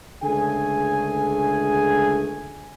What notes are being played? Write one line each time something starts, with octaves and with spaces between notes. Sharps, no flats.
C#2 D3 A3 G#4 G#5